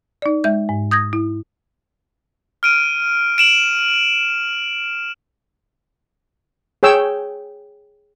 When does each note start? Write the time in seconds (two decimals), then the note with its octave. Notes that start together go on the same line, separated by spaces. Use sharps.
0.22 D#4 D5
0.44 G#3 E5 G6
0.69 G#2
0.91 D#6 G6 G#6 A#6
1.13 E4
2.63 F6 D7 D#7
3.38 D7 E7 F#7
6.83 G#4 C#5 G5 E6